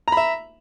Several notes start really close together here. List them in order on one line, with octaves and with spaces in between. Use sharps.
A#5 B5 E5